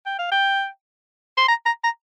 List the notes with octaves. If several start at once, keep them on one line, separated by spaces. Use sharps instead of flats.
G5
F5
G5
C6
A#5
A#5
A#5